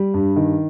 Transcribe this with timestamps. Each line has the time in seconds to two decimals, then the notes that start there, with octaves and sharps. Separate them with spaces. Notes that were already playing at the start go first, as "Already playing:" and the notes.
Already playing: G3
0.14 G2
0.36 D#3